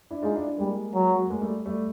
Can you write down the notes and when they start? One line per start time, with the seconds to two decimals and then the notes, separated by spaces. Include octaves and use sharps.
0.11 D4 E4
0.22 G#3 D#4 F4
0.35 D4 E4
0.47 D4 E4
0.58 G3 G#3 A#3
0.94 F#3
1.30 G#3 A#3
1.41 G3 A3
1.65 G3 A3